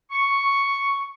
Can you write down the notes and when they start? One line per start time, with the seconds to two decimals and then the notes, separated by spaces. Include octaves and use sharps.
0.11 C#6